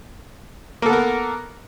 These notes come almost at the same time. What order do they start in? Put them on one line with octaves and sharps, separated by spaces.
A#3 A4 B3 A#4